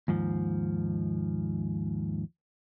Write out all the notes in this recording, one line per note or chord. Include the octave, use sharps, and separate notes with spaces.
D#2 G#2 F3